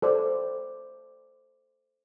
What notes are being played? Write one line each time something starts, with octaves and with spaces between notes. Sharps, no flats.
A4 C5 D5